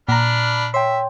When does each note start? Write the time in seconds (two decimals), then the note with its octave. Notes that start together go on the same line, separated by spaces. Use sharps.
0.09 A#2 D4 A#5 B5 F6
0.74 C#5 E5 G5 C6